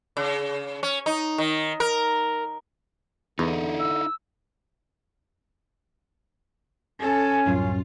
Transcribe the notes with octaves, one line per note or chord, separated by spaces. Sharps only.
C#3
C#4
D#4
D#3
A#4
E2 D3 D#4 E4
E6
C#4 A4 G#5
C2 F#2 A2 F4